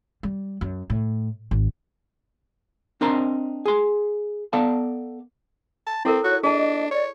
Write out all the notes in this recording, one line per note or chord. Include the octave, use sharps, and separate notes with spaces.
G3
F#2
A2
G#1
C4 D4 A#4 D#5 A#5 C6
G#4 C6
B3 A4 D5 F5 A5
A5
C4 E4 A4 A#4
F#4 C#5 F#6
D4 G#4 D#5 A5
C#5 D5